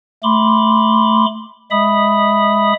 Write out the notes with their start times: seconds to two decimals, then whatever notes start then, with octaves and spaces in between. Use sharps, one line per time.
0.23 A3 B5 C6 D6
1.71 G#3 E5 B5 D#6